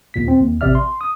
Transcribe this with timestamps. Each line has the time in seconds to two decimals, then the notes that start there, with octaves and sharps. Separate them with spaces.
0.14 D#2 A#2 B6
0.28 C4
0.41 D#2
0.61 A1 C3 D5 E5 F6
0.75 C6
1.01 D#6